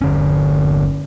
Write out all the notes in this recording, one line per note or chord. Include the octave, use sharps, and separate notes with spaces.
G1 D3 C#4